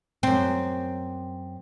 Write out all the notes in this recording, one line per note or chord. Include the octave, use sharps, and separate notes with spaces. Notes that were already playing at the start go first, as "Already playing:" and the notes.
F#2 C4